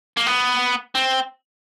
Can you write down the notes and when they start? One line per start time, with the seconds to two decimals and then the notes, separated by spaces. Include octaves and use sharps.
0.17 A#3
0.27 B3
0.95 C4